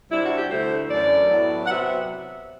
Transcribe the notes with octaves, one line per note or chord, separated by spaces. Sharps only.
C3 G3 D4 E4
F#4
G4
D2 D3 A3 E4 C5
F#2 E3 A3 D4 D5
A2 F#3 B3 E4
F#5
C3 F#3 B3 E5